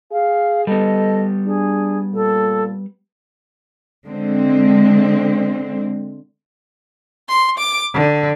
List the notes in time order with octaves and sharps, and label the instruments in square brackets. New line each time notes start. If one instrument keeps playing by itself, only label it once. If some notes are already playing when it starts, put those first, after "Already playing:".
[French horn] G#4 [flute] F5
[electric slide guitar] G3 B3 [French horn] A4 [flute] D#5
[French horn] D4 [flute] G#4
[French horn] A#2 [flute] A4
[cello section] D3 G#3 C4
[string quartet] C6
D6
D3